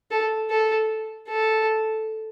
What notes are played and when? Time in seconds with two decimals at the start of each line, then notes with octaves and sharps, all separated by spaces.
0.11 A4
0.50 A4
1.29 A4